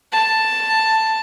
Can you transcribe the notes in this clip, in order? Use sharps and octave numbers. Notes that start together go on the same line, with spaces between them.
A5